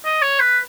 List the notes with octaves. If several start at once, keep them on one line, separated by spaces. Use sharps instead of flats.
D#5
C#5
B4